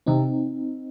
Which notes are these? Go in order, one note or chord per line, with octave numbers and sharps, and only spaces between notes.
C3 C4 D#4